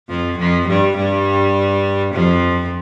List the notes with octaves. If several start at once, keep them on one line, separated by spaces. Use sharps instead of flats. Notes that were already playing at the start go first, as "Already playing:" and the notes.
F2 F3
F2 F3
G2 G3
G2 G3
F2 F3